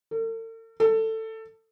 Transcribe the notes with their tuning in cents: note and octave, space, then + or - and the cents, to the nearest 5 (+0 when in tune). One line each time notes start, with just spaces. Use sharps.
A4 +45
A4 +15